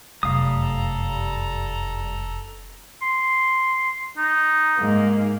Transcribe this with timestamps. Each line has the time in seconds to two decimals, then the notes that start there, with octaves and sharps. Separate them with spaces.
0.23 F1 F#2 G3 A4 F5 A#5 D#6
3.02 C6
4.17 D#4
4.77 G#2 A#3